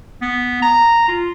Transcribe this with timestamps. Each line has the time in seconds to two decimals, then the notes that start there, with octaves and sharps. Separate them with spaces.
0.22 B3
0.62 A#5
1.08 F4